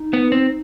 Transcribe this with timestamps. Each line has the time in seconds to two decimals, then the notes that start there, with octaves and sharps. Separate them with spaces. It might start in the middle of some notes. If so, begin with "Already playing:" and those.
Already playing: D#4
0.14 B3
0.32 C4